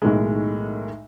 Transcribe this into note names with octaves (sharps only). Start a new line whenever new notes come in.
B1 A2 D#3 G#3